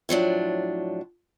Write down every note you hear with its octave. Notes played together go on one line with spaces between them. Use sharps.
A2 F3 F#3 D4